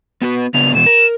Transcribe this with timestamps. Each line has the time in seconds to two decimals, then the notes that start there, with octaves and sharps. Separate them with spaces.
0.22 B3 F#4 B4
0.54 C#3 B3 D4 F7
0.75 B2 E3 B3 E7
0.86 A#4